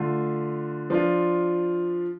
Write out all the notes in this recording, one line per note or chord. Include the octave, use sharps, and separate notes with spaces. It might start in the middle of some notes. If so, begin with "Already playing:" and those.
Already playing: D3 A3 F4
F3 D4 F4